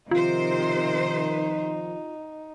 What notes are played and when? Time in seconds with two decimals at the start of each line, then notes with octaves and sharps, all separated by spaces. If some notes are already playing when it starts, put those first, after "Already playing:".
0.11 C3 D#3 F3 D#4 F4 C5